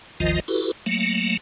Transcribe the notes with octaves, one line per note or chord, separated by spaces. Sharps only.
G#1 D#2 D#3 F3 F4 D#5
E4 F#4 G4 A4 B4
F#3 A3 A#3